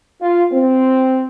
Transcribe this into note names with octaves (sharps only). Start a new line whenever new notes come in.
F4
C4